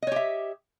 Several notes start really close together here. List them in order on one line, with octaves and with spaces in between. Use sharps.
D#5 C#5 G4 E5